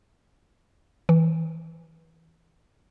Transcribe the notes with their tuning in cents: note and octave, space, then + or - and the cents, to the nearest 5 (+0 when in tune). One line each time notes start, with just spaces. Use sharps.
E3 -25